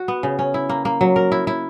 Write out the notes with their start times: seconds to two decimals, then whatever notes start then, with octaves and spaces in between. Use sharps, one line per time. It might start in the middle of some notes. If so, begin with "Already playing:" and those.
Already playing: F#4
0.08 B3
0.23 C#3
0.39 C#4
0.54 E4
0.69 A#3
0.85 A#3
1.01 F#3
1.16 A#4
1.32 E4
1.47 E4